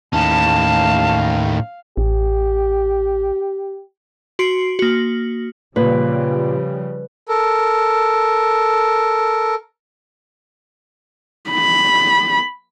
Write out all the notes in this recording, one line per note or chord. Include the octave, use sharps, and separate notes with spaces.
D#2 A2 C#4 F5 A5
A1 G4
F#4 C6 C7 D7
A#3 F#4
A#2 C#3 F3 G3 B4
A4 A#4
B5